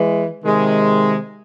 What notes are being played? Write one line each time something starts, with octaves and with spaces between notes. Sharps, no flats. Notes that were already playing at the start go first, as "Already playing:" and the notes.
Already playing: E3 G#3
C3 D#3 G#3